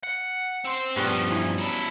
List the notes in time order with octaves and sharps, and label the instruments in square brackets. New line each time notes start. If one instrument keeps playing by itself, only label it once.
[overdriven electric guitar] F#5
C4 C5
[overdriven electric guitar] G2 F3 [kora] G3 B3 C#4
[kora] E3
[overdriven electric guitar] F#3 E4